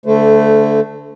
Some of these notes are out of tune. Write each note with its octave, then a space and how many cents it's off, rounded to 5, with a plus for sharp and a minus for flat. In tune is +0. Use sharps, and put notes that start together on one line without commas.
D3 -20 A3 +0 C5 -40